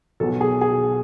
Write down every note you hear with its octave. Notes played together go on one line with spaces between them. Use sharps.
B1 B2 A4
G#4
G#4